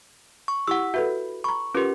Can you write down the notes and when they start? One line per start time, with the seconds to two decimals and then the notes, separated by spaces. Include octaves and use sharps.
0.48 C#6
0.68 E4 G4 F#5 E6
0.94 F#4 A4 B4 E5
1.44 A#5 B5 C#6
1.75 C#4 F4 G4 A#4 B4